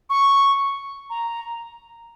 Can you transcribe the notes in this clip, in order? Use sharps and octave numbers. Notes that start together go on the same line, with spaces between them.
C#6
A#5